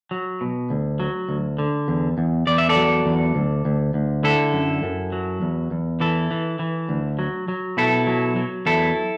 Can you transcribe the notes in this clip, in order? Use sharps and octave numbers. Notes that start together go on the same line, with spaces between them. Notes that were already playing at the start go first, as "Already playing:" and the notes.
F#3
B2
D2
F#3
D2
D3
E2
E2
E2 D5
E5
A4 D5
F#3
E2
D2
D2
D2
D3 E4 A4
F#2
F#2
F#3
E2
E2
E3 E4 A4
E3
E3
D2
F#3
F#3
B2 E4 A4
F#3
F#3
E2 E4 A4